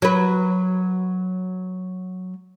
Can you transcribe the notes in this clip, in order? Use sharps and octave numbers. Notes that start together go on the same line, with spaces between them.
F#3 B4